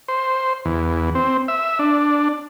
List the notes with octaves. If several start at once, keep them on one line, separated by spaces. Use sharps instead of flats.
C5
E2
C4
E5
D4